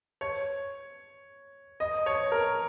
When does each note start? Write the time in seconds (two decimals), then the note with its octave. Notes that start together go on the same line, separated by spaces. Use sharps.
0.21 C#5
1.80 D#5
2.06 C#5
2.32 A#4